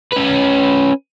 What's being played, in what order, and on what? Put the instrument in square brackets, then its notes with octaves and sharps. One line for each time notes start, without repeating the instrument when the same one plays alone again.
[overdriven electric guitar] C#4 B4